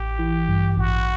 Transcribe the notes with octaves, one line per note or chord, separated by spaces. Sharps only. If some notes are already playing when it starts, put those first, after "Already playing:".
Already playing: A1 G4
E3
G2
A1 F#4